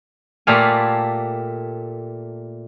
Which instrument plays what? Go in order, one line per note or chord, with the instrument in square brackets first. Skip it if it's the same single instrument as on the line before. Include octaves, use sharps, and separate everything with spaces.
[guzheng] A#2 A3 G4 F5 G#5